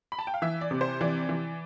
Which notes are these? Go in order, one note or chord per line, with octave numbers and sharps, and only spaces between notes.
B5
A5
G5
F5
E3 E5
D5
C3
C5
E3 D5
E3